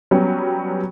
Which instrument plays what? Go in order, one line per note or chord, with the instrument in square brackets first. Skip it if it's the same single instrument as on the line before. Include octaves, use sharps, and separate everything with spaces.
[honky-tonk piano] F#3 G3 B3 C#4